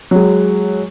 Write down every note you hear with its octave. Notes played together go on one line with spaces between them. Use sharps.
F#3 G#3